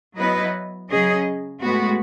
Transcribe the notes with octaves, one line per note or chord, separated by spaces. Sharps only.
F#3 B3 E4 B4 D#5
C#3 F#3 C#4 G#4 D#5
A2 G#3 B3 F#4